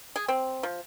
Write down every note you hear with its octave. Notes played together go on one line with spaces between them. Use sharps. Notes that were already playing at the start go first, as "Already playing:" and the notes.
G#4
C4
F3